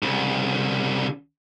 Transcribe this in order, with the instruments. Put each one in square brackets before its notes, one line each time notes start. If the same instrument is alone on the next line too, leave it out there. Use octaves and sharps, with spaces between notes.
[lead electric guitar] C2 C#3